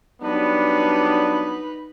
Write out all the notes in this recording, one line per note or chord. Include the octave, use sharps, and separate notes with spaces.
F#3 G3 B3 D4 D#4 B4